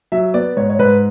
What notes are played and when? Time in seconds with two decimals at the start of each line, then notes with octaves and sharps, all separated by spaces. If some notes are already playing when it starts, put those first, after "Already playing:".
0.12 F#3 E5
0.34 B3 D5
0.57 G#2 C#5
0.70 C#5
0.79 G#2 B4